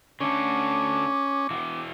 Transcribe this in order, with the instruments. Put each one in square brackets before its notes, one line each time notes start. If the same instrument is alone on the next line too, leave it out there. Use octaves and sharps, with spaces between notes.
[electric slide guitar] D3 A3 [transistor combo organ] C#4 [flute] D6
[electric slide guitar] E3 E4 F#4